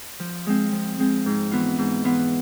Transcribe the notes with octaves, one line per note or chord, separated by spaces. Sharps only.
F3
G#3 C4
F3
G#3 C4
G#2
E3 B3 F4
G#2
E3 B3 F4